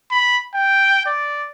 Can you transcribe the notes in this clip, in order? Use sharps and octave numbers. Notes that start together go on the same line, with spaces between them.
B5
G5
D5